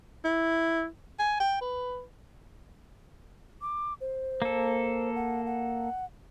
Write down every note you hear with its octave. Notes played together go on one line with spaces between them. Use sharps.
E4
G#5
G5
B4
D6
C5
A#3 A4
F#5
F#5